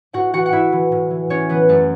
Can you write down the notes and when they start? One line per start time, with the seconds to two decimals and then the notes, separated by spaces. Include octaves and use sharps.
0.13 A2 F#4 F#5
0.33 E3 F#4 F#5
0.46 F#5
0.52 A2 E4 E5
0.72 E3
0.92 A2
1.11 E3
1.30 A2 C#4 C#5
1.49 E3 B3 B4
1.69 F#2 A3 A4